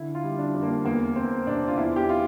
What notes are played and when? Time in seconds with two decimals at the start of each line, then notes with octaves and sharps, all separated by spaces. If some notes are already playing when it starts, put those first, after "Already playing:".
Already playing: D3 E4
0.15 F4
0.23 G3
0.39 D4
0.54 F2
0.62 A#3
0.84 E2 A#3
1.16 E2 C4
1.47 C3 D4
1.68 F4
1.77 E2 E4
1.96 G4
2.09 F4